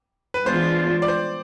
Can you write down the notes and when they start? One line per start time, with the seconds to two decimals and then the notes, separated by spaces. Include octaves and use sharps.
0.34 B4
0.46 E3 G#3 B3 D4 F4 C5
1.02 D5
1.08 C5